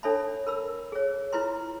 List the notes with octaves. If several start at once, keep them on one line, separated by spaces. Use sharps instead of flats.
D4 A4 C#5 E5 A5 B5
A#4 B5 E6
G#4 C#5
E4 F4 B4 A#5 C6